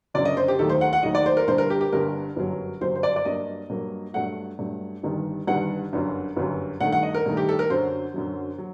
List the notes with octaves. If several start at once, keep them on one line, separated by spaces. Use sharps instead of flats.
F#1 F#2 D3 D5
D#5
C5
G4
D#2 D#3 F#3 A3 A4
C5
F#5
F#5
D#2 D#3 F#3 A3 D#5
D5
C5
A#4
G1 G2 D3 C5
A#4
G4
G4
G1 G2 D3 A#4
G1 F#2 F#3
G1 F#2 F#3 C5
C5
D5
D5
G2 F#3 A#3 D#5
G2 F#3 A#3
G2 F#3 A3 F#5
G2 F#3 A3
G1 G2 D#3 G3
G1 G2 D#3 G3 F#5
G1 F#2 D3
G1 F#2 D3
G2 D#3 A3 F#5
F#5
D#5
A#4
G2 D#3 A3
G4
A4
A#4
F#2 D3 F#3 C5
F#2 D3 F#3
F#3